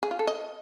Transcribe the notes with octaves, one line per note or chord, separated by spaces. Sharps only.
G#4
F4
A4
D#5